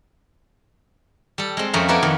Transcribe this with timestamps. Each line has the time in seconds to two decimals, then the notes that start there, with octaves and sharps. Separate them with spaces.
1.38 G3 A4
1.57 G#3 C4
1.73 F2 F3 A3 C#4 A#4
1.88 B3 E4 A#4 B4 D5
2.03 F2 D#3